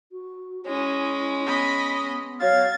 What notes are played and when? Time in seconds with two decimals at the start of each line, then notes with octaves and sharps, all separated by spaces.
0.12 F#4
0.67 G#3 C#4 E4
1.46 B3 D#5 B5
2.40 F#3 F#4 F5 G#6 A6